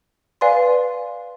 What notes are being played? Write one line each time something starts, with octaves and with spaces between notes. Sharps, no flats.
B4 D5 F5 G#5 C6